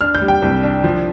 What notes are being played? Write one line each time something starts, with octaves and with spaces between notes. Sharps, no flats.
D4 F6
G6
G3
G5
C2
D4
F3